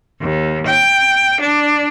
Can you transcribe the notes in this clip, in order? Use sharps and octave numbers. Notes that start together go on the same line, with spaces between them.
D#2
G5
D4